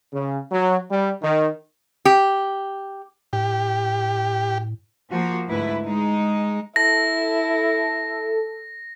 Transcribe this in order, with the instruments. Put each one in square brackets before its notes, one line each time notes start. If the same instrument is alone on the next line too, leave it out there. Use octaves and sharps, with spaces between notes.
[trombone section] C#3
F#3
G3
D#3
[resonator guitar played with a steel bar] G4
[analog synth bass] A2 [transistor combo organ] G4
[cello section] F3 A#3 F#4 C5
D2 G#2 E4 B4
G#3 D#4
[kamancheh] E4 [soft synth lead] A4 [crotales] A#6